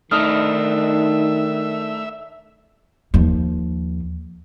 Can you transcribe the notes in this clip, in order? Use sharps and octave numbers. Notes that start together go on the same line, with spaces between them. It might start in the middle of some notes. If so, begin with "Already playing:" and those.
D#3 A3 D4 D#4 E5 D#6 F6
D#2 F3